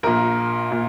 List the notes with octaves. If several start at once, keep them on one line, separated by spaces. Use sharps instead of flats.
A#1 A#2 A#4
A#2